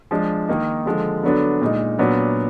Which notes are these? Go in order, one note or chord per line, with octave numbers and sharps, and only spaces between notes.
F3 G#3 D4
D#3 A#3 D#4
D3 F3 G#3
D3 F#3 B3 D4
A#2 G#3 D#4
A#2 F#3 B3 D4